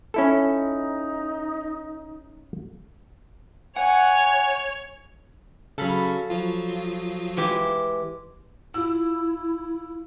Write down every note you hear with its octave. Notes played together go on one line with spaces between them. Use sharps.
C#4 D#4 E4 A4
C#5 F#5 G#5
C#3 F#3 A4 F5 B5
F3 F#3 F4
E3 G#3 G4
E4 F4 E6